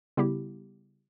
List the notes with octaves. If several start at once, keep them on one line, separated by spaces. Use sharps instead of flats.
C#3 G3 B3 E4 G4